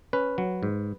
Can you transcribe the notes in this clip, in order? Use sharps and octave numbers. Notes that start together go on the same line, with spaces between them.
C#4 B4
F#3
G#2